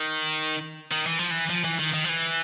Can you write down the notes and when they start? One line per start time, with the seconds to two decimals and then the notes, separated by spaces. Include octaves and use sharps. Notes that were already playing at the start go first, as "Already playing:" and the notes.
Already playing: D#3
0.91 D#3
1.06 E3
1.19 F3
1.31 E3
1.50 F3
1.64 E3
1.79 D#3
1.94 D#3
2.04 F3
2.09 E3